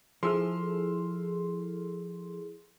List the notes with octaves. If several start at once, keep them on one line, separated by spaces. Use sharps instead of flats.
F3 E4 G#4 A4 C6 E6 F6